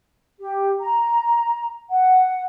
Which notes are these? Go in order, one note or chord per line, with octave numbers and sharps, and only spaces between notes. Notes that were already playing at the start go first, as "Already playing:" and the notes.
G4
A#5
F#5